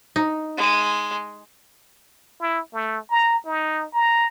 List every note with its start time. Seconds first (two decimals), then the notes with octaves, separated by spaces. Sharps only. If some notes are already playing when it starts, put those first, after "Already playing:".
0.16 D#4
0.57 G#3
2.40 E4
2.73 A3
3.10 A#5
3.45 D#4
3.93 A#5